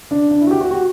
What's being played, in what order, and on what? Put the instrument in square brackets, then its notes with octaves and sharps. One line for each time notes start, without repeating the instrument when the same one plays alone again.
[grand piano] D4
D4
E4
F#4
G4
F#4
F#4